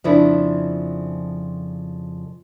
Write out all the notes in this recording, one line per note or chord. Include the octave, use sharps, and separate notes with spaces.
F2 C#3 F3 D4 E4